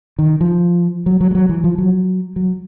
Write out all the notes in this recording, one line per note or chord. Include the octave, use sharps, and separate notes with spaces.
D#3
F3
F#3
F#3
G3
F#3
E3
F3
F#3
F#3